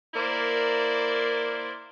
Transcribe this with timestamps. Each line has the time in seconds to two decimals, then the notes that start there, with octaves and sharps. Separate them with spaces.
0.14 A#3 E4 A#4 C5 D5